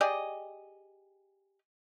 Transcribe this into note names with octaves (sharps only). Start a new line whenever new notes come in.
G4 G#4 D5 D#5